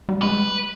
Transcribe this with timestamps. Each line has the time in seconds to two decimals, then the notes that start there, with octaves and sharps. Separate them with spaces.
0.09 G3
0.22 G#3 B4